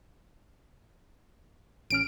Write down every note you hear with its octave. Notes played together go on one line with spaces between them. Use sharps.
A1 C#4 F6 D7